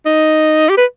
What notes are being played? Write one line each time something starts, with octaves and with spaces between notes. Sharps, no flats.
D#4
G4
B4